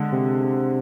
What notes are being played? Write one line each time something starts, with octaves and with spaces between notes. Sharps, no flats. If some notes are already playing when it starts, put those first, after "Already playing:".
Already playing: D3 G#3
C3